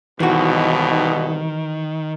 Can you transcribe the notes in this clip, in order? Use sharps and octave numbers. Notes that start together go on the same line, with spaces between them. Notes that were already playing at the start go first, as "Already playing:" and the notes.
C2 G#2 B2 D#3 E3 F#4